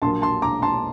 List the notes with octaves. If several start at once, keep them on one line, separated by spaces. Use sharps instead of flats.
A#1 A#2 F#3 A#3 A5 C6
A5 C6
A#5 D6
A5 C6